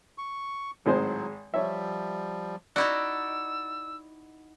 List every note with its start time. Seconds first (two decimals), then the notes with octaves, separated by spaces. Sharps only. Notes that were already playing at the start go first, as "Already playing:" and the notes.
0.18 C#6
0.86 G#1 A2 F#3 G#3 C5
1.54 F3 G3 C#5 E5
2.76 D#4 E4 F#4 D5 E6